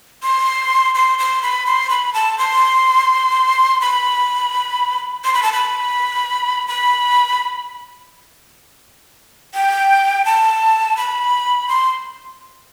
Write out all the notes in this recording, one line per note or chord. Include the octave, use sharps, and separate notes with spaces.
C6
C6
C6
B5
C6
B5
A5
C6
B5
C6
B5
A5
B5
B5
G5
A5
B5
C6